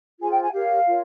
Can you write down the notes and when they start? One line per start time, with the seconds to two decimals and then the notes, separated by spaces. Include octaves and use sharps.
0.20 F4 G#4 C5 G#5
0.30 G5
0.42 G#5
0.53 G4 A#4 C#5 F5
0.86 F4 A#4 C#5